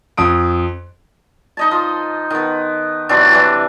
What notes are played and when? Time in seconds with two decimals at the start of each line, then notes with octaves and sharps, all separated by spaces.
0.17 F2 D#6 D7
1.57 D#4 D#5 A5
1.71 F3
2.30 D#3 B3
3.09 C3 E3 F#3 D4
3.31 E3 G3